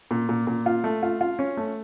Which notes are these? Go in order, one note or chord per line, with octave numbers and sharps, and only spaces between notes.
A#2
A#2
A#2
F4
A3
F4
F4
C#4
A3